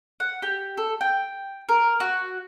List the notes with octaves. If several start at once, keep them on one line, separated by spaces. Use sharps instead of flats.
F#5
G4
A4
G5
A#4
F#4